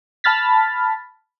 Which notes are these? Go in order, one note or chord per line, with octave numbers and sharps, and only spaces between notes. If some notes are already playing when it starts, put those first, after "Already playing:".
A5 B5 F6 A6 B6